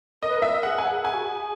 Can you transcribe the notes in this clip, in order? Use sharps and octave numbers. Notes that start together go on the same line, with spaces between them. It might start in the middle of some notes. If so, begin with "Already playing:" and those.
A#4 D#5
B4
A#4
E5
A#4
G#4 F#5
G#5
F#5
G#4 G#5
F#4
G#4